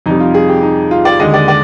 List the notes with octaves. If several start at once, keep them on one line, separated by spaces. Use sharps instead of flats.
F2 C3 G3 D#4
F4
G#4
G4
D#4
F4
D5
D#2 D3 G#3 D#5
D5
D5